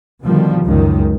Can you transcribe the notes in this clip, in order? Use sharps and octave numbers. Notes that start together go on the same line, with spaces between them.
B2 D3 D#3 F3 G3
C#2 F#2 D#3